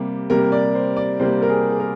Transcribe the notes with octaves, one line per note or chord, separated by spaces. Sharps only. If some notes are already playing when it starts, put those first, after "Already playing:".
Already playing: C3 G3 A#3
C3 G3 A#3 A#4
D5
C5
D5
C3 G3 A#3 C5
A#4
G#4
G#4
A#4